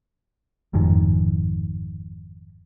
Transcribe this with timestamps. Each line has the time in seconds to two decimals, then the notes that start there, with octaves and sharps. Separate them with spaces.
0.73 G1 F2 G#2 D#3